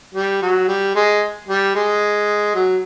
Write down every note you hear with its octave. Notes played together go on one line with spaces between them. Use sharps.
G3
F#3
G3
G#3
G3
G#3
F#3